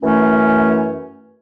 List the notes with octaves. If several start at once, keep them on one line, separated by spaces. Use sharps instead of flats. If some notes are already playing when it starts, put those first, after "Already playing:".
F#2 E3 A3 C#4